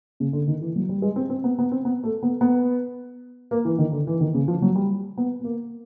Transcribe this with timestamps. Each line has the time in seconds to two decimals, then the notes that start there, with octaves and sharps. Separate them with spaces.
0.20 C#3
0.33 D3
0.48 D#3
0.61 E3
0.76 F#3
0.89 G3
1.02 G#3
1.16 C4
1.30 C4
1.44 B3
1.59 B3
1.72 C4
1.85 B3
2.04 A3
2.23 B3
2.41 B3
3.51 A#3
3.65 E3
3.78 D#3
3.92 D3
4.07 E3
4.20 D#3
4.34 C#3
4.48 F3
4.62 F#3
4.76 G3
5.18 B3
5.41 B3
5.44 A#3